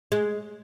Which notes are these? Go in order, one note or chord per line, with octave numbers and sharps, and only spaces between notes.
G#3